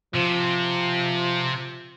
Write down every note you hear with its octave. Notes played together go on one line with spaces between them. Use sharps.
C3 F3